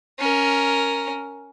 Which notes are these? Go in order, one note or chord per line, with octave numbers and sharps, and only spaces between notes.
C#4 A#4